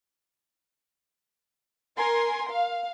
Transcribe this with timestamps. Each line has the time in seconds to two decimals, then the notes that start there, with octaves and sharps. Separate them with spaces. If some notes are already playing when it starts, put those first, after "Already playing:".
1.96 A#4 G#5 C6
2.51 F5